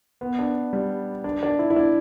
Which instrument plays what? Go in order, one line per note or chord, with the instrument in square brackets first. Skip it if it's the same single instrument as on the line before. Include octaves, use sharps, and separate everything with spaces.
[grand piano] B3
D4
G3
D4
D4
E4
E4
D4